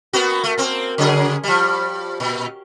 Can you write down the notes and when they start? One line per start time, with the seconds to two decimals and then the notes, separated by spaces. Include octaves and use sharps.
0.13 A#3 B3 F#4
0.44 A3
0.58 A#3 C4
0.98 C#3 F#3 G#4
1.43 F3 G3
2.20 A#2